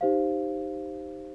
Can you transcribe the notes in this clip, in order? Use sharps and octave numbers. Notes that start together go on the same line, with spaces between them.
D#4 G4 C5 F5